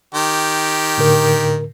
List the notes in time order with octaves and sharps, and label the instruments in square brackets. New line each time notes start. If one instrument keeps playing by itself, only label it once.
[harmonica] D#3 G4
[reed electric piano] A2 D3 A#4